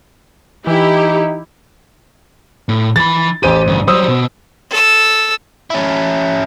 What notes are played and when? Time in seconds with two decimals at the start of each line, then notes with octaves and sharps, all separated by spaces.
0.67 E3 D#4 E4 G4
2.69 A2
2.96 E3 B5 A6
3.43 A1 G4 C5 D#7
3.67 D2 G2
3.87 F#3 G3 C5 D#6 E6
4.08 B2
4.70 A4 E6
5.70 C#4 E4